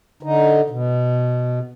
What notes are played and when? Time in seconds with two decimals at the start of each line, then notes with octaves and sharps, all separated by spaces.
0.23 D3 D#4
0.70 B2